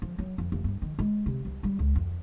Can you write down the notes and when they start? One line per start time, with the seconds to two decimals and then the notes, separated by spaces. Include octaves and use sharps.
0.02 F3
0.18 F#3
0.38 F2
0.52 F1
0.64 G2
0.82 D#3
0.99 G#3
1.26 C3
1.45 C2
1.63 G3
1.79 C#2
1.95 F2